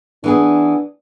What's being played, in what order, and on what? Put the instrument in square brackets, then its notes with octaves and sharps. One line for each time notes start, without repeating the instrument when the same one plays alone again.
[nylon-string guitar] E3 B3 G#4 [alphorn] D4